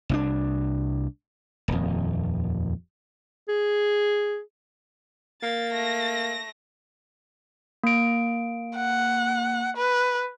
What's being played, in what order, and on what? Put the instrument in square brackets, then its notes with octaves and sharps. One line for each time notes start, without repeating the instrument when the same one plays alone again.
[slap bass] C2 C#4 D4
D#1 F2
[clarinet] G#4
[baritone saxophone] A#3 [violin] A6
[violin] A3 A#6
[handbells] A#3 D7
[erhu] F#5
B4